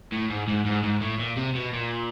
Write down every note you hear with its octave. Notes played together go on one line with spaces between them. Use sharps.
A2
G#2
G#2
G#2
G#2
A2
A#2
C3
B2
A#2